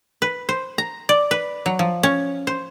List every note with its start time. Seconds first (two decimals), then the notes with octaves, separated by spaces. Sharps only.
0.22 B4
0.49 C5
0.78 A#5
1.09 D5
1.31 B4
1.66 F#3
1.79 F3
2.03 C#4
2.47 C5